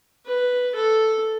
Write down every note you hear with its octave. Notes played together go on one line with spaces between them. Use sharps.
B4
A4